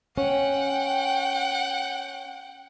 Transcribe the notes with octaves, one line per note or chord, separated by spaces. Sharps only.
C#4 F#5 G5